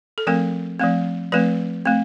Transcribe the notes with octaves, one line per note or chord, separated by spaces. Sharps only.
A4
F3 A3 C4 A#4
F3 A3 C4
F3 A3 C4 B4
A3 C4